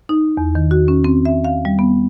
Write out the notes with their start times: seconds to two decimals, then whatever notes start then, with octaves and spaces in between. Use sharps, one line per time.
0.09 D#4
0.37 E2
0.55 D#3
0.71 F#4
0.88 C#4
1.04 C4
1.25 E5
1.44 F5
1.65 G3
1.79 B3